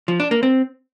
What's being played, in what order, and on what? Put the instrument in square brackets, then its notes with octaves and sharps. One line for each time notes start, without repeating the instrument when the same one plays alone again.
[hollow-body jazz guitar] F3
D4
A#3
C4